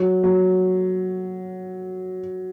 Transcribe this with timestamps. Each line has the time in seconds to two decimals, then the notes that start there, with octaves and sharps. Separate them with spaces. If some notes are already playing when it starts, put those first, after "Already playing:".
Already playing: F#3
0.24 F#3